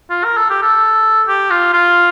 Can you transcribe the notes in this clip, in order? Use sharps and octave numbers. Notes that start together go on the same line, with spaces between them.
F4
A#4
A4
G4
A4
G4
F4
F4